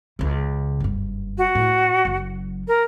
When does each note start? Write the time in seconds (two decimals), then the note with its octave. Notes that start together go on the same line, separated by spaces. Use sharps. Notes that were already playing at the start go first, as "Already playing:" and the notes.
0.19 C#2 C#3
0.80 F#1 G2
1.38 F#4
1.55 A2
2.05 F#1 F#3
2.68 A#4